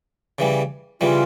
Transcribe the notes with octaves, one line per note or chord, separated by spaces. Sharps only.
C#3 E3 G3
C#3 E3 G3 F4